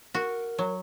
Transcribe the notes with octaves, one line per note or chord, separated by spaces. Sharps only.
F#4 A#4
F#3